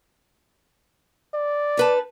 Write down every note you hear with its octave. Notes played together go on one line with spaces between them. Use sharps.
D5
D#4 B4 A5